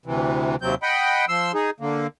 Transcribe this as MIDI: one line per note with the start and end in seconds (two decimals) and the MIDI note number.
0.06 0.56 38
0.06 0.56 48
0.06 0.56 52
0.62 0.75 39
0.62 0.75 48
0.62 0.75 54
0.62 0.75 60
0.62 0.75 91
0.83 1.25 75
0.83 1.25 78
0.83 1.25 79
0.83 1.25 83
1.29 1.52 53
1.29 1.52 84
1.29 1.52 88
1.54 1.70 63
1.54 1.70 68
1.80 2.07 50
1.80 2.07 58